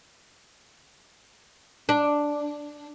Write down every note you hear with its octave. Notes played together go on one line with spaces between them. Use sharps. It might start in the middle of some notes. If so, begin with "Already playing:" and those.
D4